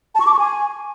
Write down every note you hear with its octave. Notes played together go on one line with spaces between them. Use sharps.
A5
C#6
D6
C#6
G#5